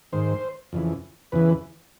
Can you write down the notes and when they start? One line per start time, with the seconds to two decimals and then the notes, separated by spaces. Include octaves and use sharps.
0.13 G#2 D#3 C5
0.73 F2 C#3 E3
1.32 E2 C#3 E3 B4